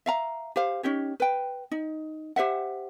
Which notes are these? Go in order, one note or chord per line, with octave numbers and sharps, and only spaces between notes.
E5 F5 A#5
G4 C5 F5
C#4 D#4 G4 C#5
B4 G5
D#4
G4 C5 E5 F#5